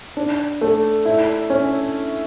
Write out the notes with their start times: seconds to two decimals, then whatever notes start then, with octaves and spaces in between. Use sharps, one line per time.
0.17 D4
0.61 A3
1.06 E4
1.50 C#4